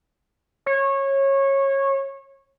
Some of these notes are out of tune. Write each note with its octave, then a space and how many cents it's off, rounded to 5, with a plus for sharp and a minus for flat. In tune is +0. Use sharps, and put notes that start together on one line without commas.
C#5 -20